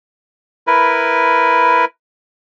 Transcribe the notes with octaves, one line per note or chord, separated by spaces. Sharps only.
E4 A#4 B4